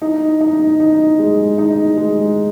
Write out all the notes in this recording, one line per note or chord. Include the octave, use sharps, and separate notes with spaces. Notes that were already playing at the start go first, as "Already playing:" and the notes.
D#4
D#4
D#4
G#3
D#4
G#3